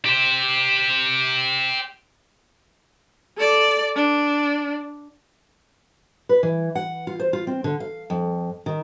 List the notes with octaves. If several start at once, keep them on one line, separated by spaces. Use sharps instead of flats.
G4 C5
A4 D5
D4
B4
E3
F#5
F4
C5
F4
C4
D3
F5
F2
D#3